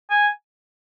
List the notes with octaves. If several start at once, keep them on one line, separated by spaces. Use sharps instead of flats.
G#5